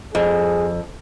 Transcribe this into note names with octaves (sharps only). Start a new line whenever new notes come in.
F2 G#4